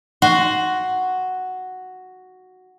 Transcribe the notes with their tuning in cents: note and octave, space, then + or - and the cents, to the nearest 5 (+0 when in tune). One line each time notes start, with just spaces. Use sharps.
F#4 +0 C6 +0